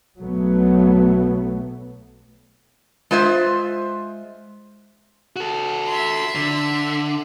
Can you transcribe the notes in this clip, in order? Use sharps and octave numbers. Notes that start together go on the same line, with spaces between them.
B1 F#3 A3 B3
G#3 F4 C5 E5
F#4 A4
E5 C6
D3